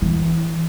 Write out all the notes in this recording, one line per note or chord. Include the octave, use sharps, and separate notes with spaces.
E3